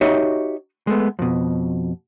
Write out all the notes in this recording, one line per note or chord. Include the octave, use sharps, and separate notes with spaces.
D#4 F#4 G4 C#5 D#5 E5
G#3 A3 B3
F2 B2